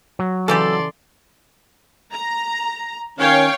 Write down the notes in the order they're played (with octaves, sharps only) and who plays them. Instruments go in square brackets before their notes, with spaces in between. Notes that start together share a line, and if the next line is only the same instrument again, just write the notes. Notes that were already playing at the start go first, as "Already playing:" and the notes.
[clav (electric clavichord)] F#3
[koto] C#3 E3 G4 [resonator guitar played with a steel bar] A4 [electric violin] D5 C6
[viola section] A#5
[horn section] D#3 C#4 [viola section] C#5 F5 G5